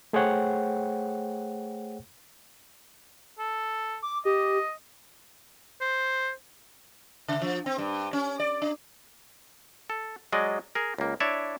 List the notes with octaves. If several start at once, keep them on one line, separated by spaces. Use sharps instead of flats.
A3 G#4 C5 C#5 F#5 G5
A4
D6
G4 D#5
C5
C#3
F3
C4
G2
C#4
D5
D4
A4
F#3 G#3 D5 D#5
G#4 A#4
C#2 A#3
D4 E4 C#5 D5 E5